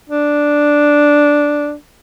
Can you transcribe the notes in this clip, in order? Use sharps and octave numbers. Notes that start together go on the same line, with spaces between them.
D4